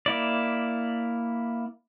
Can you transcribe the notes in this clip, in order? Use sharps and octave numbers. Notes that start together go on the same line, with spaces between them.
A#3 E4 D5